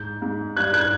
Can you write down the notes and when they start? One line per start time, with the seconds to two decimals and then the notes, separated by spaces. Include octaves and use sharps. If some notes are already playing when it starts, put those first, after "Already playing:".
Already playing: G#2 G6
0.22 G#2
0.57 G2 F#6 G#6
0.74 F#6 G#6